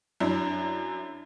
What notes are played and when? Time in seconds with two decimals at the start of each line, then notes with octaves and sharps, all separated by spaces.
0.20 F#2 D4 E4 A#5